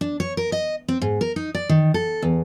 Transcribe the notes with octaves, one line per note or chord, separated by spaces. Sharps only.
D4
C#5
A#4
D#5
C4
G#2
A#4
D#4
D5
D#3
A4
E2